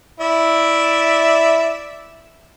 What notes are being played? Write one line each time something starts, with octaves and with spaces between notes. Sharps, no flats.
E4 D5 E5